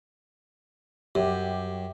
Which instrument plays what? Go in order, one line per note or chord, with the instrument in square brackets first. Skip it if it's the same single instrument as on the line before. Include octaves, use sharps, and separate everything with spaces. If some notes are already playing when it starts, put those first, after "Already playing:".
[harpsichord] F#2 [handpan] G4